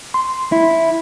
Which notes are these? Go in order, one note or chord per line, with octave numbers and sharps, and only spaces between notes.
C6
E4